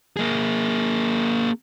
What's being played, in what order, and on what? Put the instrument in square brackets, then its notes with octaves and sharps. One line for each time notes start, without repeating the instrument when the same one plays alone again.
[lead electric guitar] A#3 G#4